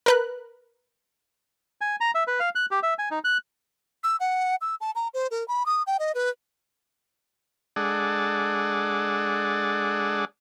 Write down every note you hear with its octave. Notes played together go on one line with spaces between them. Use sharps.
A#4 B4 F#6
G#5
A#5
E5
B4
F5
F#6
G4
E5
G#5
D#4
F#6
E6
F#5
E6
A5
A#5
C5
A#4
B5
D#6
G5
D#5
B4
G#3 D4 G#4 A4 D5 F#5